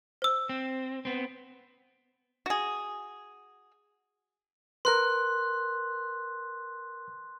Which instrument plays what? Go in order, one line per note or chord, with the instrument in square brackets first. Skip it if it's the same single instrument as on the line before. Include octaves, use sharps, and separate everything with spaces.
[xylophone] C5 E6
[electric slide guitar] C4
B3 C4
[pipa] F#4 G#4
[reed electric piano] A#4 B4 [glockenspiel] C6 F#6